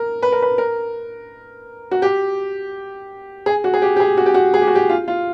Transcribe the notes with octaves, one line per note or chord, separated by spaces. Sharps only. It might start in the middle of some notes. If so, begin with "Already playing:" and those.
Already playing: A#4
B4
A#4
B4
A#4
F#4
G4
G#4
F#4
G#4
G4
G4
G#4
F#4
G4
F#4
G#4
G4
F#4
G4
F4
F4